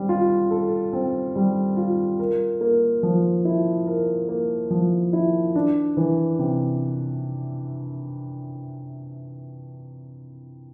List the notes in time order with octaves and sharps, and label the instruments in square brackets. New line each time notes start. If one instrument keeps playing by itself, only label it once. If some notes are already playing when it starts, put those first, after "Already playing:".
Already playing: [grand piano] G3 C4
F4
A4
C4
G3
F4
A#4
A#3
F3
E4
A#4
A#3
F3
E4
D4
E3
C3